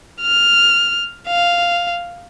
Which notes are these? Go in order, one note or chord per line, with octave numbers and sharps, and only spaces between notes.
F6
F5